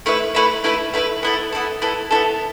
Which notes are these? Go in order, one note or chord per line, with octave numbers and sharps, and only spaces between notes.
A3 E4 B4 E5
A3 E4 B4 E5
A3 E4 B4 E5
A3 E4 B4 E5
B3 E4 A4
B3 E4 A4
B3 E4 A4
B3 E4 A4